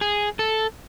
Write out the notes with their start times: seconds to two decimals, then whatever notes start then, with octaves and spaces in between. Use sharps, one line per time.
0.01 G#4
0.39 A4